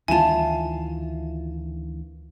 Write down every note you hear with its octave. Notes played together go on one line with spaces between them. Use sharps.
D2 D#3 E3 E4 F4 G#5 A5